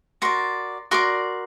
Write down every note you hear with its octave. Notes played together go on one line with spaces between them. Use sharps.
F#4 A#4 D5 C6
F#4 A#4 D5 C6